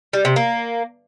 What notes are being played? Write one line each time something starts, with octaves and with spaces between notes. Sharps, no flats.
G3
C3
A#3